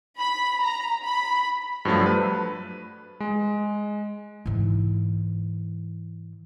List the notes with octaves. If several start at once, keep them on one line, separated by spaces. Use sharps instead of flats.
B5
A#5
B5
G2 F3 F#3 A3
B4
G#3
G#2 E3